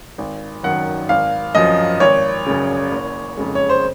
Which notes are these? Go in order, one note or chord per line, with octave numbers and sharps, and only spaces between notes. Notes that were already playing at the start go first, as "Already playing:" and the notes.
G#1
F#2 D#3 F#3 F#5
G#1 F5
F#2 F3 D#5
G#1 C#5
F#2 C#3
F#1
F2 C#3 G#3
C#5
C5